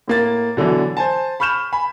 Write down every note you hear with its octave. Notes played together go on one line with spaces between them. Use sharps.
A2 A#3 A6
B2 D3 E3 F#3
C5 G#5 A5
B5 C#6 F6 G6 E7
G#5 B5